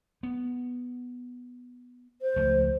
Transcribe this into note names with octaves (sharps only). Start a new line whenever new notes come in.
B3
C5
C#2 F3 A3